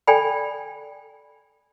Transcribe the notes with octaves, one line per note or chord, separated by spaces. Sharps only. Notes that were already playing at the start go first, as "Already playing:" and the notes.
A4 D5 G5 G#5 B5